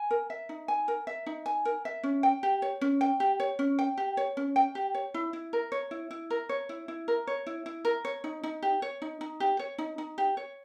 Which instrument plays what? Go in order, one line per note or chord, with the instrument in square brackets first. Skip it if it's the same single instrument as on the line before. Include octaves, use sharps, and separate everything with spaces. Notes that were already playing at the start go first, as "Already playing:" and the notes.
Already playing: [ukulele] G#5
A#4
E5
D#4
G#5
A#4
E5
D#4
G#5
A#4
E5
C#4
G5
G4
C#5
C#4
G5
G4
C#5
C#4
G5
G4
C#5
C#4
G5
G4
C#5
E4
E4
A#4
C#5
E4
E4
A#4
C#5
E4
E4
A#4
C#5
E4
E4
A#4
C#5
D#4
D#4
G4
C#5
D#4
D#4
G4
C#5
D#4
D#4
G4
C#5